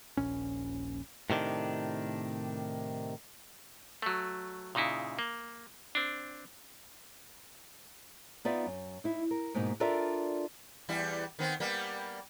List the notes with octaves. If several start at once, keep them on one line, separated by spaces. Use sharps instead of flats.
D#1 A#1 C#4
A2 C3 D#3 D4
F#3 A3
A#2 C#3 D#4 E4
A#3
C4 D4
B3 D#4 F4 B4 D5 E5
F#2
D#4 E4
A#4
G#2 B2 A#3 D#4
D4 F4 A4 A#4 D5 E5
E2 G3 E4
D#3 B3 C4
G3 A#3 B3